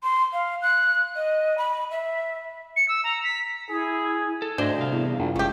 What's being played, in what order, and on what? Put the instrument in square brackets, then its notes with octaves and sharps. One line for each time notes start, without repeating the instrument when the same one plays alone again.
[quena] C6
F5
F#6
D#5
B5
E5
[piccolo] C#7
E6
A#5
B6
[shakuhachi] E4 [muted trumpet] G#4
[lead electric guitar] A4
[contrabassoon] D2 [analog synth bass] G#2 [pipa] D4 [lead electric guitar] C5 D#5
[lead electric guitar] C2 F5 [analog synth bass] C3
[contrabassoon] E2
[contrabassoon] A#1 [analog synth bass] F#2
[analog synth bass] G1 [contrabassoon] C#2 [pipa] A3 G4